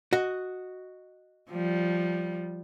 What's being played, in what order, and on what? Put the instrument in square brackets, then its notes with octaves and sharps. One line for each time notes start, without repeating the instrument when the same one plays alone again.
[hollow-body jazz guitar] F#4 D#5
[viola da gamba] F3 G3